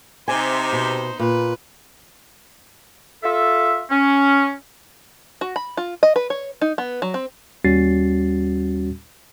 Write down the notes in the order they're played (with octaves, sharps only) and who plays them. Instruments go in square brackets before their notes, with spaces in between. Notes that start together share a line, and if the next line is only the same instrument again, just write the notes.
[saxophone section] C3 [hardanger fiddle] D#4 C5 [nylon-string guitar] G#5
[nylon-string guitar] B2
[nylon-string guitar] A#2 [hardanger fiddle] B4
[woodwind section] F4 A4 E5
C#4
[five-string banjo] F#4
B5
F4
D#5
B4
C#5
D#4
B3
F#3
C4
[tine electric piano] D#2 G3 C#4 F#4 A6 C7